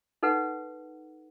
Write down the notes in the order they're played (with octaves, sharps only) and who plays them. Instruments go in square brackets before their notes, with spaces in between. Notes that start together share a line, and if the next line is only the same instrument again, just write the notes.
[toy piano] D#4 A4 B4 F#5